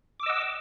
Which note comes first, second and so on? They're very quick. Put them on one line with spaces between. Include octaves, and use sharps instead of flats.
D6 E6 D#5 F#5